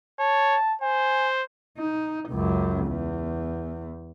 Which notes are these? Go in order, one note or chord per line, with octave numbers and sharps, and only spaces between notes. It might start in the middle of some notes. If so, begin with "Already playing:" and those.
C#5 A5
C5 G#5
D#4
C#2 F#2
E2